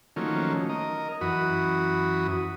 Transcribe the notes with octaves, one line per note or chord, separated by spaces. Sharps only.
D#3 F3 F#3 A3 A#3 C#4
A#4 D#5
F#2 E3 F#4 B5 D#6